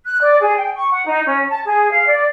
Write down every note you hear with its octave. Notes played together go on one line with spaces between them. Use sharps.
F#6
D5
G#4
G5
C#6
F#5
D#4
C#4
A5
G#4
F5
D5